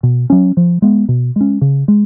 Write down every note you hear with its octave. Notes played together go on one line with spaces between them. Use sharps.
B2
F#3 C#4
F3
G#3 B3
B2
G#3 C#4
C#3
G#3